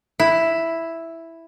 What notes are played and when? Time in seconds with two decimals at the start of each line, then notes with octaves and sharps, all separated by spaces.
0.20 E4